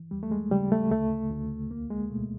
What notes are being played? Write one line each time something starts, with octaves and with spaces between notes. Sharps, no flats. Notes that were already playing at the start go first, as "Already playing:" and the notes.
Already playing: E3
D#2 G3
A3
G#3
C#3 G3
A3
D2 A3
D2
C2 A#3
G#3
B2 A3